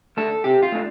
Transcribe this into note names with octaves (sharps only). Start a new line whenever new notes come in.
A3 D4 A4
C3 G4
F4
A3 D4